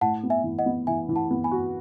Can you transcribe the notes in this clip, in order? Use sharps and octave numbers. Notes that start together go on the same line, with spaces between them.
A2 F#5 A5
B3
E5 G#5
E3
D#5 F#5
B3
E3 E5 G#5
E3
F#5 A5
B3
G#5 B5
F#4